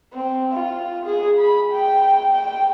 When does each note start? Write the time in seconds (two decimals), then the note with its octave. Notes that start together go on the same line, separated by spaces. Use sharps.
0.13 C4
0.53 F4
1.05 G#4
1.38 B5
1.71 G5
2.32 G5